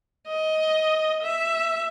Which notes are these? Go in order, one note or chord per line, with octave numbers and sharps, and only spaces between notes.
D#5
E5